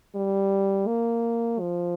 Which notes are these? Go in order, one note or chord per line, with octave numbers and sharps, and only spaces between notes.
G3
A#3
F3